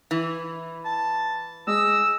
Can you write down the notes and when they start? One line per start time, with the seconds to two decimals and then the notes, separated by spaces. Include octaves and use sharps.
0.11 E3
0.85 A5
1.67 G#3 D#5 E6